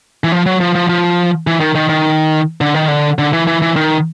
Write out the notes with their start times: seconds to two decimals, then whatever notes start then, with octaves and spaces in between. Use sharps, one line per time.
0.24 E3
0.32 F3
0.46 F#3
0.61 F3
0.75 F3
0.89 F3
1.47 E3
1.60 D#3
1.75 D#3
1.89 D#3
2.61 D3
2.74 D#3
2.88 D3
3.19 D3
3.33 E3
3.47 E3
3.62 E3
3.76 D#3